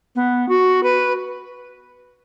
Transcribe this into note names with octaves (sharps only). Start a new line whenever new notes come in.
B3
F#4
B4